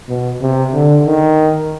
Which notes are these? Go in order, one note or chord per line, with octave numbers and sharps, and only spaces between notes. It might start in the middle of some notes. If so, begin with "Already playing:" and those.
B2
C3
D3
D#3